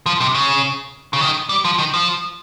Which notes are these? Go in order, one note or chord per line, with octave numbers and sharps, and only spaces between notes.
F3
C3
C#3
C#3
D#3
G3
F3
D#3
F3